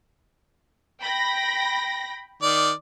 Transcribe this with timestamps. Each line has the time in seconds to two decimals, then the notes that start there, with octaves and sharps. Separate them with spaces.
1.01 G5 B5 A#6
2.42 D#3 D5